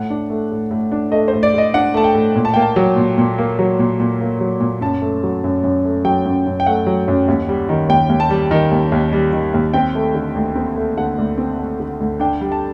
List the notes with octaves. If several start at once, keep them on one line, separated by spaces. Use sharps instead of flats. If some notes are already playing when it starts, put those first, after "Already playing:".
Already playing: A2 F#5
D4
A3
A2
A2
D4
A3 D#5
C5
A2
D5
A2 D#5
D4 F#5
A3 A5
G5
A2
A#2
A5
A#3 G5
A5
F#3
A#2
A#2
A#3
F#3
A#2
A#2
A#3
F#3
A#2
F#2 A5
A3
F#3
F#2
F#2
A3
F#3 G5
F#2
F#2
G5
A3 F#5
F#3
F#2
D#2
G3
D#3
D#2 G5
D#2
A5
G3
D#3
D#2
D#2
G3
D#3
D#2
C4 G5
A3
D3
D2
C4
A3
D3 F#5
D2
C4
A3
D3
D2
D4 G5
G3
A5